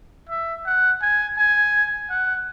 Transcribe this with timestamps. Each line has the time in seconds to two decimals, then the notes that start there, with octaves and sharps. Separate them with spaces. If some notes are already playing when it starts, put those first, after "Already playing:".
0.29 E5
0.66 F#5
1.02 G#5
1.38 G#5
2.10 F#5